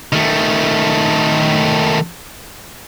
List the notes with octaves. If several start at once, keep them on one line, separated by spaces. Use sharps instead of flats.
D#3 A3